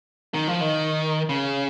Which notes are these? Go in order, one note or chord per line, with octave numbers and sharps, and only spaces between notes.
D#3
F3
D#3
C#3